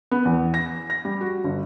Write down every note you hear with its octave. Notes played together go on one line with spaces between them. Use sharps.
B3
E2
A#6
A#6
G3
F#4
G1